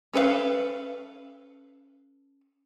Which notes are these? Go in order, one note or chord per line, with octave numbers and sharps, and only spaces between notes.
C#4 A4 B4 C5 F5